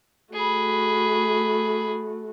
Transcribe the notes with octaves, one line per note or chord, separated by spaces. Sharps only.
A3 F#4 G#4 B5